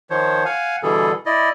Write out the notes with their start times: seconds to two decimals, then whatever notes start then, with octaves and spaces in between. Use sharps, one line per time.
0.10 D#3 F3 C5 C#5
0.45 F5 F#5 G#5
0.83 B2 D3 E3 G3 G#4 A4
1.26 E4 D5 D#5